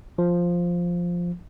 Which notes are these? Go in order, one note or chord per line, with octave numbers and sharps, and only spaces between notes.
F3